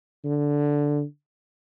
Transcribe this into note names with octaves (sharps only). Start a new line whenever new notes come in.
D3